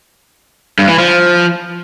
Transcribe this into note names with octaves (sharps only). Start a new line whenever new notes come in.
G2
E3
F3